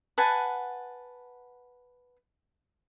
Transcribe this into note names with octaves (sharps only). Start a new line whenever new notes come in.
B4 F#5 G#5 A5